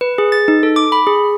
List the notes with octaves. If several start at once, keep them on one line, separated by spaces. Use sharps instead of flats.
B4
G#4
A6
D#4
A4
D6
B5
G#4